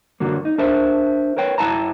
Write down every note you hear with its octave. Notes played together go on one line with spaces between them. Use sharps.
F#2 D3 F#3 A#3
D#4
D4 A#4 C5 E5
A#4 B4 C#5 G5
F#2 E4 F5 G5 A5 A#5